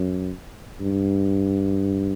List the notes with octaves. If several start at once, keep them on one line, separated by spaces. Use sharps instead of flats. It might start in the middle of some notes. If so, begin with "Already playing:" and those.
Already playing: F#2
G2